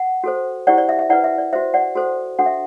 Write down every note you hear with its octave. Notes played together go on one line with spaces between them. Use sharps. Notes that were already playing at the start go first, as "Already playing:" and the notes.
Already playing: F#5
F#4 A4 C5
E4 G4 C5 D5 F#5
D5
E5
E5
E4 B4 D5 F#5
E5
D5
F#4 C5 E5
D5 F#5
F#4 A4 C5
D4 F#4 A4 F#5
E5